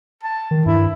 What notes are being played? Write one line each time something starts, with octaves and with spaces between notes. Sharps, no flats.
A5
D#3
G2 E4